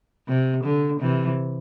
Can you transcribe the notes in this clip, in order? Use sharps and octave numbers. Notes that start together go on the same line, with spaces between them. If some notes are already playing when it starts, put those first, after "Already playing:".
C3
D3
C3 E3